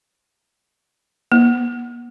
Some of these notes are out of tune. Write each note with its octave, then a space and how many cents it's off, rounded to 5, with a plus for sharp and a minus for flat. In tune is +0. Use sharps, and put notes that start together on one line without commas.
A#3 +45